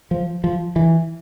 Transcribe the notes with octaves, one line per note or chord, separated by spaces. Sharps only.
F3
F3
E3